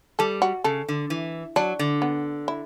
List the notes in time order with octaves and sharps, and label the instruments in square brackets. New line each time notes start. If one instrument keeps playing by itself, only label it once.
[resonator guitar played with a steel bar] G3 [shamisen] A4
[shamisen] F#4
[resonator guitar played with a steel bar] C#3 [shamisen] A4
[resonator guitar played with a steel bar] D3
E3
[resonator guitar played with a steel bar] F#3 [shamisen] D4
[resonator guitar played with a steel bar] D3
[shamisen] B3
E4